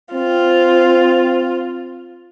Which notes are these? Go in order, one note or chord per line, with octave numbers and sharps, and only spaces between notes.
C4 F4